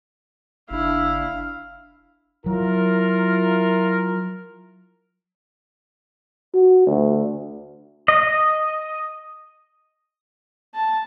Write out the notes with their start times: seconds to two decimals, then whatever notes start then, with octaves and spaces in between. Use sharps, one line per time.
0.71 F#1 D4 E4 F5
2.46 F#3 E4 F4 A#4
6.54 F#4
6.87 D2
8.08 D#5
10.74 A5